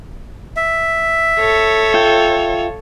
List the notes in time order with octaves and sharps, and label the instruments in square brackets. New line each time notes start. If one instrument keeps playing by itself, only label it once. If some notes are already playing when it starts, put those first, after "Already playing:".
[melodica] E5
[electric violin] A4 C#5
[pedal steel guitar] F4 E5 G5